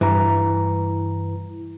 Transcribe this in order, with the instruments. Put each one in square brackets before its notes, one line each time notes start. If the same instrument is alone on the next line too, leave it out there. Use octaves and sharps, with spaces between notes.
[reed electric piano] G2 A#5 [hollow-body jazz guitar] E3